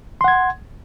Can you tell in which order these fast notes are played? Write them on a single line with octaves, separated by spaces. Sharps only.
C6 F#5 G#6